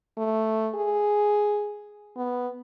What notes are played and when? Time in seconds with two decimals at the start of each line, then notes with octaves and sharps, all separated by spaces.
0.17 A3
0.75 G#4
2.16 B3